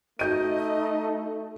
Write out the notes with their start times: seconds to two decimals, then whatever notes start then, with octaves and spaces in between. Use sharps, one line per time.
0.19 A3 D#4 F#4 D#5 G6 D#7